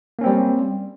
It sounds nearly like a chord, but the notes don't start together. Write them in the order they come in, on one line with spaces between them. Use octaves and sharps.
A#3 C#4 C4 G3